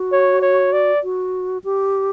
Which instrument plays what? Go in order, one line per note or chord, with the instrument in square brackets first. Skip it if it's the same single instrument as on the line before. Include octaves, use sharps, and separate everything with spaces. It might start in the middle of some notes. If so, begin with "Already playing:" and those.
Already playing: [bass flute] F#4
[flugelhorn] C#5
C#5
D5
[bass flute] F#4
G4